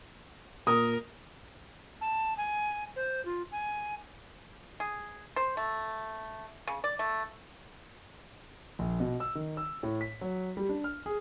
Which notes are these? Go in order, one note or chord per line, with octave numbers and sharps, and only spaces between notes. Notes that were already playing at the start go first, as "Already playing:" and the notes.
A#2 A#4 D#6
A5
G#5
C5
F4
G#5
G#4
C5
A3
C#3
D5
A3
A#1
B2
E6
D#3
E6
A2
B6
F#3
G3
D4
F6
G#4